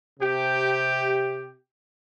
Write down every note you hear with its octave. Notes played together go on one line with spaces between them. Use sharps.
C3 G4